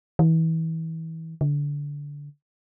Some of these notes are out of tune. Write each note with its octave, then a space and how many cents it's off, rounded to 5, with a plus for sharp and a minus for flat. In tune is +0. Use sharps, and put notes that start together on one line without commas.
E3 -30
D3 -20